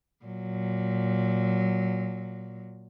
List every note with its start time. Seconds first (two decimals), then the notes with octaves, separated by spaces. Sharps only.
0.24 A#2 F#3